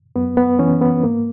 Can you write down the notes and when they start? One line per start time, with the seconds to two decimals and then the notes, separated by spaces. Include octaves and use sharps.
0.16 F#2 B3
0.37 B3
0.59 E3 C#4
0.81 B3
1.03 G#2 A#3